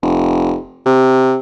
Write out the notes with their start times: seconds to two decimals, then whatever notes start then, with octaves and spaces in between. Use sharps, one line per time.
0.03 F1
0.86 C3